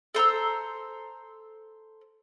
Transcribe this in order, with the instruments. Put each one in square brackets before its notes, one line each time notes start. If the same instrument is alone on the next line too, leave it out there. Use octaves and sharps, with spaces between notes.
[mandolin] A4 C5 A#5 E6